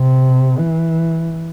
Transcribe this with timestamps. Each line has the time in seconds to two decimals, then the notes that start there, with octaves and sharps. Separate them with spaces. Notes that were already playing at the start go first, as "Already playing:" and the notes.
Already playing: C3
0.58 E3